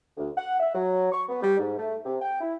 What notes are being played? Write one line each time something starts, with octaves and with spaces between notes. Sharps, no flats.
D2
F#5
E5
F#3
C#6
B3
G3
G#2
A3
C3
G5
E4